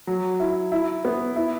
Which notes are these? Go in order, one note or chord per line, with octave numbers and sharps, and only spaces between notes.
F#3
E4
E4
B3
E4